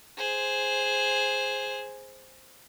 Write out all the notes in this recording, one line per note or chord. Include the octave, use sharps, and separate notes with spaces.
G#4 C5